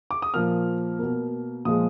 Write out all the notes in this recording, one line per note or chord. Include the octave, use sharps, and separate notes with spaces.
D6
D#6
A#2 F3 A#3 F6
B2 A#3
A#2 F3 G#3 D#6